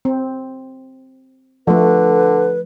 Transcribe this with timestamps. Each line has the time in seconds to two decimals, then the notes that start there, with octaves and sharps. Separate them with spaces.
0.05 C4
1.67 D3 F3 A3 B4